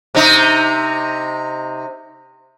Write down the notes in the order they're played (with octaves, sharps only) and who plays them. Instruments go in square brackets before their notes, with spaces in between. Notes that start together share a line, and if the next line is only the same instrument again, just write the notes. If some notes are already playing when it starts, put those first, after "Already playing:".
[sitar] C3 D#4